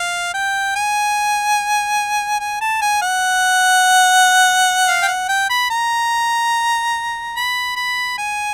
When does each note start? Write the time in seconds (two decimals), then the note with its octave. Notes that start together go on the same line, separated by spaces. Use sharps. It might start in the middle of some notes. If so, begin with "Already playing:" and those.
Already playing: F5
0.34 G5
0.76 G#5
2.40 G#5
2.61 A5
2.82 G#5
3.02 F#5
4.88 F5
5.03 G5
5.08 F#5
5.28 G5
5.50 B5
5.70 A#5
7.36 B5
7.76 B5
8.18 G#5